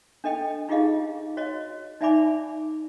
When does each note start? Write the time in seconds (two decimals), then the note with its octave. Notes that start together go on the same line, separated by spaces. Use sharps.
0.24 D4 A4 D#5 G5
0.69 D#4 F4 G4 G#4 D#5 F5
1.37 F#4 C#5 D#5
2.01 D#4 D5 E5 G#5 B5 D6